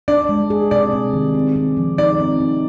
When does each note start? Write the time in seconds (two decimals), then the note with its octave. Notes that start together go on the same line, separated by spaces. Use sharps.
0.08 D4 D5
0.29 G#3
0.50 G#4
0.71 C3 D5
0.93 C3
1.13 D#3
1.35 C4
1.56 C4
1.77 F3
1.98 D#4 D5
2.20 C4
2.40 D#4